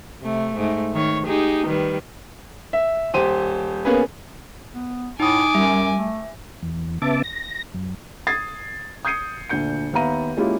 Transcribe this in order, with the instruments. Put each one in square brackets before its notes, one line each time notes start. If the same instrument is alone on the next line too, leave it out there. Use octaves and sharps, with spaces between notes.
[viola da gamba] C3 A3
G#2 A3
D#3 C#5
D#4 G4 G#4
D#3 G3 B4
[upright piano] E5
D#1 G4 C5 D#7
A#3 B3 C#4 G#4 B4
[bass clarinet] B3
[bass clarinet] A2 [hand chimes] D#4 D#6 [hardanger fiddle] G#5 D6
[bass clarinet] F#2 [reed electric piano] G3 [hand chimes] E5
[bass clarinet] A3
[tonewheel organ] E2
C#3 B3 E5 A5 D6
A#6
F#2
[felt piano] D#6 G#6 A6 C7
D#6 G6 G#6 C7 C#7 D#7
D2 A#2 D4 G6 C#7
D#2 B3 E5 F5 A#5 D#7
G#3 A#3 C#4 E4 F4 G4